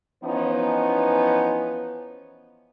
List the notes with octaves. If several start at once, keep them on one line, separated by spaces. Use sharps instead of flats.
E3 F3 B3 C#4 D#4 B4